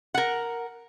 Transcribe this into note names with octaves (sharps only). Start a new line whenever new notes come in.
A#4 F#5